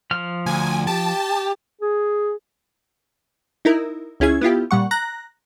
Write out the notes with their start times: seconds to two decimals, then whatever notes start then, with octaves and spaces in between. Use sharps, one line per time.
0.11 F3 F6
0.46 D2 G#5
0.87 G4 A5
1.82 G#4
3.65 D#4 E4 A#4
4.20 C#2 C#4 E4 G#4 G#6
4.41 B3 E4 F4 G4
4.71 A#2 G3 F#5 C#6
4.91 A#5 F#6 A#6